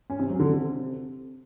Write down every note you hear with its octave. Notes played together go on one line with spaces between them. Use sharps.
C#4
C3
F#3
D3
C3